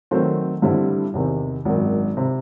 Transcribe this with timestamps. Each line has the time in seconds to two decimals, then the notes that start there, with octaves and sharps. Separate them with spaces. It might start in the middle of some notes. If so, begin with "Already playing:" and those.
0.11 D#3 F#3 A3 C4
0.62 G2 D3 G3 C4 E4
1.14 E2 C3 D#3
1.65 G#1 F#2 D#3
2.17 C3